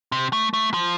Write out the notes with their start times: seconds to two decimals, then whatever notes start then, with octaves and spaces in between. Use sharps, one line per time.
0.12 C3
0.33 A3
0.54 A3
0.74 F3